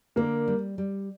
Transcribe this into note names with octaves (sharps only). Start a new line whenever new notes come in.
D3 A#3 A#4
G3
G3